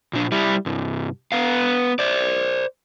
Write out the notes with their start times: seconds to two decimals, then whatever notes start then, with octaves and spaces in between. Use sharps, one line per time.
0.13 A#2 D4
0.32 G3 E4
0.66 C2 G2
1.32 B3 F5
1.99 C5 D5